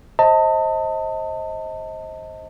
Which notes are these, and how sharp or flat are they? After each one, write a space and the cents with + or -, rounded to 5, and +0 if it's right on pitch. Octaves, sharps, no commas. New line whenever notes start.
C5 +25 D#5 +25 A5 +30